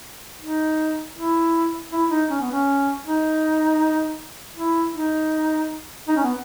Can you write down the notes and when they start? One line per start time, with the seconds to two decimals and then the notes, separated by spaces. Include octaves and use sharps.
0.41 D#4
1.16 E4
1.91 E4
2.10 D#4
2.30 C#4
2.41 B3
2.52 C#4
3.05 D#4
4.56 E4
4.94 D#4
6.08 D#4
6.16 C#4
6.24 B3